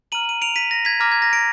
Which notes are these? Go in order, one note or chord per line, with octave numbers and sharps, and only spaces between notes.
A#5 F6 D#7 F#7
D#7
D7 F7
B6 D#7
A#6
G#6 B6
A#5 D6 F6 A#6
G#6
A#6
A#6 D7